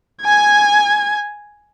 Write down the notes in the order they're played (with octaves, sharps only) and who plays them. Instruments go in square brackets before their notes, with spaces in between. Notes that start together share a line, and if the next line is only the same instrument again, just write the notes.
[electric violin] G#5 G#6